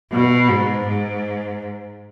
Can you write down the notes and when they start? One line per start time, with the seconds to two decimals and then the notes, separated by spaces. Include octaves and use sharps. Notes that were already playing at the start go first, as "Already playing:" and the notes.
0.12 B2
0.49 G#2
0.86 G#2